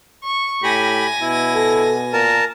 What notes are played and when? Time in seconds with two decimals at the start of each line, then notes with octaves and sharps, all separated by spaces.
0.22 C#6
0.63 A2 G4 G#5 B5 A#6
1.21 B2 E4
1.55 A4
2.13 A#2 A#4 A5